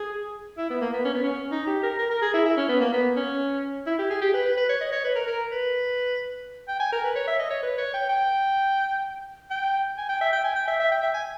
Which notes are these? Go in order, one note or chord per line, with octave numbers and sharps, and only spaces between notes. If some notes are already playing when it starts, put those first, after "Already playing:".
Already playing: G#4
E4
B3
A#3
B3
C#4
B3
C#4
D#4
G4
A#4
A#4
A#4
G#4
E4
E4
C#4
B3
A#3
B3
C#4
E4
G4
G#4
G4
B4
B4
B4
C#5
D#5
C#5
B4
A#4
A#4
B4
G5
G#5
A#4
B4
C#5
E5
D#5
C#5
B4
C#5
G5
G5
G5
G#5
G5
E5
G5
G#5
G5
E5
E5
G5
E5
G#5